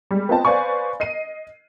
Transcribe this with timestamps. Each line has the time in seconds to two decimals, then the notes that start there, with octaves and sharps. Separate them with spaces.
0.11 G3 G#3
0.29 B3 C4 F4 D#5 G5 A5
0.45 B4 C5 D5 F5 G#5 C#6
1.00 D#5 C7 D#7